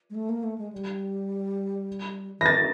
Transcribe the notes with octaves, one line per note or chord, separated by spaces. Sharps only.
G#3
A3
A#3
A3
G#3
G3
E3 A#6
D#3 A6